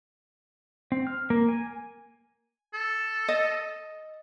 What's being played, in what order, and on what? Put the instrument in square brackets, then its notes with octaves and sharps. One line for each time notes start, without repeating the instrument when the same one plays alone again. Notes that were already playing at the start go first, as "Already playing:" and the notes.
[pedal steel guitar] C4
F6
A#3
G#5
[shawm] A4
[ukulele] D#5